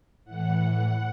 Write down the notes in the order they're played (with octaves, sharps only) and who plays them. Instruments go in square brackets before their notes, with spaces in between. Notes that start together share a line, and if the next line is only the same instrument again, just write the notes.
[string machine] A2 E3 F#5